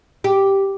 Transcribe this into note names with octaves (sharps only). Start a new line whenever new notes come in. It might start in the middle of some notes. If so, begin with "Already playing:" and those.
G4